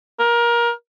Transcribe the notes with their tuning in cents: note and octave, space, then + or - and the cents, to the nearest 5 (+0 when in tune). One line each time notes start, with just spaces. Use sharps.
A#4 +25